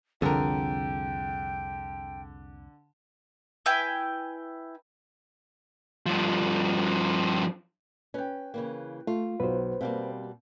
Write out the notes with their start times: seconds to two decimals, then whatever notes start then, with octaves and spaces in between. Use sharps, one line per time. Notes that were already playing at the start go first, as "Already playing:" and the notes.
0.22 C2 F2 D3 G#4 A#4 G5
3.66 E4 B4 G5 G#5
6.06 G2 F3
8.14 C#4 B4 G5
8.54 C#3 E3 A#3
9.07 A3 F4
9.40 B1 F#3 B4 C5
9.81 B2 G3 A#3 C4 F5